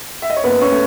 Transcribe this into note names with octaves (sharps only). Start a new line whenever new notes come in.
E5
D#5
C#5
F#1 B3 B4
C#4 C#5
A3